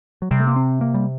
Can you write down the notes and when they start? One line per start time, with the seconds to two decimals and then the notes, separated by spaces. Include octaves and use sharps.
0.22 F#3
0.31 C3 G3
0.40 A3
0.47 A#3
0.56 C4
0.81 A#3
0.94 G3